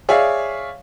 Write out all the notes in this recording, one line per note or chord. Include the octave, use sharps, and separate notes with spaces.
G#4 C#5 D5 E5 F5